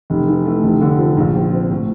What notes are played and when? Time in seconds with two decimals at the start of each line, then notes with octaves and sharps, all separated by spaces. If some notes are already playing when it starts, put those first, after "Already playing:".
0.10 F1
0.27 E3
0.45 A3
0.63 F1
0.81 D3
0.99 F3
1.17 A#1
1.35 F3
1.53 C4
1.70 A2